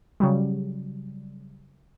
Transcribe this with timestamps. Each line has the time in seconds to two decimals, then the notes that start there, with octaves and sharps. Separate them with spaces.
0.20 C#3 F#3 G3